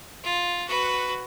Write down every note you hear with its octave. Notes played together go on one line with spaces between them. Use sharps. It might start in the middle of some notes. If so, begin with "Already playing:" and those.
F4
F#4 B4